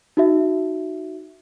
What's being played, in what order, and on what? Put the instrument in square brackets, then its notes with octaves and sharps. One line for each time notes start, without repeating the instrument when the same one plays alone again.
[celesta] D#4 F#4 E5